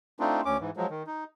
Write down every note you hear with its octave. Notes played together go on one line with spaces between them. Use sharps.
A3 C4 D4 D#4 F4
D2 C#4 D6
G#2 E3
F3 F#3 G#3
D#3
D#4